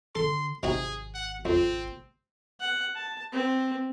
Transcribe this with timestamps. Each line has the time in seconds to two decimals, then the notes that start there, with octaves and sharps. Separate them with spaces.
0.15 D3 A4 C6
0.63 G#1 C3 D#4 F#4 G#4
1.14 F#5
1.45 F2 C4
2.60 F#5
2.96 A5
3.33 C4